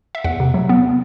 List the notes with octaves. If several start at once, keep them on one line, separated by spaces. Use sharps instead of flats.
E5
E2 F#5
C3
F#3
B3